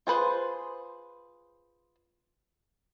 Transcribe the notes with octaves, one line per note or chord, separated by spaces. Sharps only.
F4 G#4 B4 C5